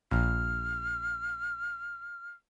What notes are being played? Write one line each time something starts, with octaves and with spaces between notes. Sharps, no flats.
A#1 F6